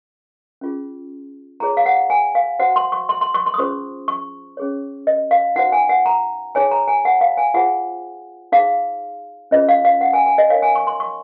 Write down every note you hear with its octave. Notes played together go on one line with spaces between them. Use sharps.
C#4 F4 G#4
F4 G#4 C#5 A#5
F5
F#5
G#5
F5
F#4 C5 F#5
C6
C#6
C6
C6
C#6
C6
D#6
C#4 F4 G#4 C5 C#6
C#6
C#4 G#4 C#5
D#5
F5
D#4 F#4 C5 F#5
G#5
F#5
A#5
D#4 G#4 C#5 G#5
A#5
G#5
F#5
F5
G#5
F4 G#4 C5 F#5
D#4 G#4 C5 F5
C#4 F4 G#4 C5 D#5
F5
F5
F#5
G#5
G#5
D#5
D#4 A#4 C#5 F5
G#5
C#6
C6
C#6